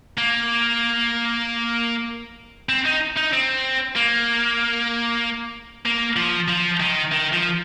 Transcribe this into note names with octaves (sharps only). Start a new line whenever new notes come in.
A#3
C4
D#4
D#4
C4
A#3
A#3
F3
F3
D#3
D#3
F3